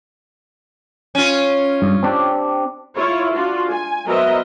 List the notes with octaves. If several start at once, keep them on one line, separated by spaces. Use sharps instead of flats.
C#4 F4
G2
C4 D4 G4
E4 F4 C#5
D4 F4 F#4
G#5
F#3 B3 A#4 C5 D#5 E5